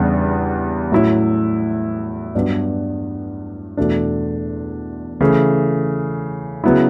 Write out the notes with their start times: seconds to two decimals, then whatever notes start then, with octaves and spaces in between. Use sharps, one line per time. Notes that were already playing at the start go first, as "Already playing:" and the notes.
Already playing: E2 C#3 G3 B3 D4
0.92 A2 F#3 C#4 E4
2.35 G2 F#3 B3 D4
3.77 E2 B2 A3 D4
5.21 C#3 E3 A3
6.64 C#3 F#3 B3 E4